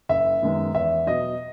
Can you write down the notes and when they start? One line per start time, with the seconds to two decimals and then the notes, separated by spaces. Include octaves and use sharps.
0.09 F#1 E5
0.42 F#2 D#3 G#3 B3
0.75 E2 E5
1.07 B2 F#3 D#5